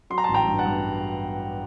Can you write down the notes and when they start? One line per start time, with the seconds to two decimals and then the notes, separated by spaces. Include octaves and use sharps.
0.10 F#3 C6
0.18 A#5
0.24 A5 C6
0.29 A1
0.34 G5 A#5
0.47 G2
0.58 F#5 A5
0.65 G2